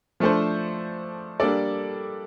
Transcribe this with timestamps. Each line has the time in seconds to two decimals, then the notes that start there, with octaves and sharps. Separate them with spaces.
0.20 F3 A3 D4 A4 C5
1.40 G3 A#3 D4 A4 D5